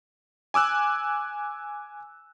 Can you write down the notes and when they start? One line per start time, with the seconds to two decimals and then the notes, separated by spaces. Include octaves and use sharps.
0.54 G#5 D6 E6 F#6